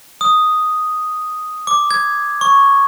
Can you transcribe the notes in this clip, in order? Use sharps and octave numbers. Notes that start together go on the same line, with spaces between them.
D#6
D6
G#6
C#6